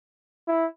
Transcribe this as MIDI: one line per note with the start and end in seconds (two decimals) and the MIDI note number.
0.48 0.66 64